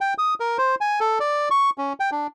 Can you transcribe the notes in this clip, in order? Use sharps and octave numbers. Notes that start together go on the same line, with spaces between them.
G5
D#6
A#4
C5
G#5
A4
D5
C#6
C#4
G5
D4